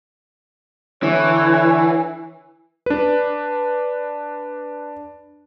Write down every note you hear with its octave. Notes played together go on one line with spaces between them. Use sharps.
D3 E3 C#5
D4 B4